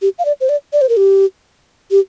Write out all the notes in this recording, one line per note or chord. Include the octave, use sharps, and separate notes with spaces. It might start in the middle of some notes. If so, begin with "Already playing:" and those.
G4
F5
D5
C5
D5
D5
C5
A#4
G4
G4